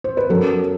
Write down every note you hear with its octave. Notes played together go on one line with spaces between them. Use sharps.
C5
B4
F#2 F#3 A4